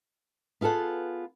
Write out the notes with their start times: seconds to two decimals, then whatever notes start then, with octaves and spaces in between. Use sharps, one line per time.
0.61 B3 F4 G#4 A4 F#5